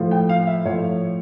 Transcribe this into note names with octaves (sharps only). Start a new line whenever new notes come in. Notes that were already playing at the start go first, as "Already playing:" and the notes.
Already playing: A2 F3
G5
F5
E5
A2 F3 C#5